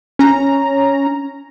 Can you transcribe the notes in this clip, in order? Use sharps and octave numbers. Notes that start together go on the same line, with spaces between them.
C#4 A#5